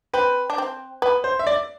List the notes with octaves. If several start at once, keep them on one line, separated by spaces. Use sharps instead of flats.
C4 B4
D4
C4
B3 B4
C5
E5
D5